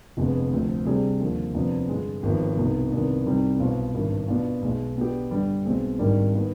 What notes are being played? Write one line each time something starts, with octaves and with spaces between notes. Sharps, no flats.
F1 F2 D3 G#3 B3
D2 C3 F3 C4
C3 G3 D4 G#4 C5
D#2 D3 F3
F2 C3 F3 B3 D4
G2 D3 G#3
G#1 G#2 F3 B3
C2 B2 B3 D#4
C2 C3 D#3 B3 D4
C2 C3 G3 C4 D#4
B1 B2 B3 F4 C5
G#1 G2 D#3
B2 B3 D4 F4
B1 B2 G#3
B2 B3 D4 G4
G2 D3 G3
B1 B2 G#3 C4
G#1 G#2 D#3 G3 D4
D#3 B3